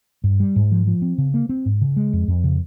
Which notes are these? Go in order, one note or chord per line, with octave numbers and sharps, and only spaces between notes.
G2
G3
G#2
F3
F3
C4
C#3
A#3
C4
G#2
C#3
G#3
F2
F2
C#3